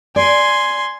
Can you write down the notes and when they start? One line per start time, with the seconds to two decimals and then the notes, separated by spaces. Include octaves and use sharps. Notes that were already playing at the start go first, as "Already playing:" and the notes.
0.16 D5 G#5 C6